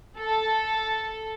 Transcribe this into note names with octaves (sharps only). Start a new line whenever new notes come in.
A4